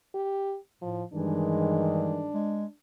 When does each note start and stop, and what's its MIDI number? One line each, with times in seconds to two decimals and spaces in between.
0.14 0.57 67
0.81 1.04 45
0.81 1.03 53
1.13 2.33 43
1.13 2.33 51
1.13 2.20 52
1.13 2.33 56
1.13 2.73 62
2.34 2.65 56